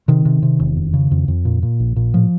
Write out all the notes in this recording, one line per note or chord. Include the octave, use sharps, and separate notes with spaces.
C3 D#3
C3
C3
E1
F2
C#3
F2
F2
A#2
A#2
A#1
A#2
A2 F3